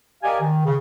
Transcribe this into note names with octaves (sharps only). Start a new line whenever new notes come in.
G4 A#4 D5 D#5 F5 G#5
D#3
C#3